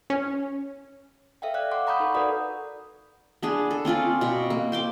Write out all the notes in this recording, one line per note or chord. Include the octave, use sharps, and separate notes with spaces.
C#4
A4 E5 F5 G5
D5 F5 G5 F#6
F5 F#5 C6 D6
F#5 A#5 B5 C#6 D#6 G6
D#4 A4
F#4 A#4 B4 D5 F#5 D#6
B3 D4 G#4
A4
C4 C#4 F4 D5
B2 C4
A#3
C5 G5 D6